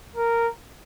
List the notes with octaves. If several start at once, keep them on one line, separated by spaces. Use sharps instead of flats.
A#4